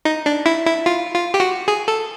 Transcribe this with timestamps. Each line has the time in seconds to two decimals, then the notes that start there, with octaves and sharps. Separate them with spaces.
0.05 D#4
0.26 D4
0.46 E4
0.67 E4
0.86 F4
1.14 F4
1.34 G4
1.40 F#4
1.68 G#4
1.88 A4